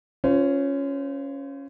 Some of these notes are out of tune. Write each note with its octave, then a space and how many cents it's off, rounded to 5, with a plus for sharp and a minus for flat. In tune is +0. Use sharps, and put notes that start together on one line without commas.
C#4 +0 F4 +0 C5 -35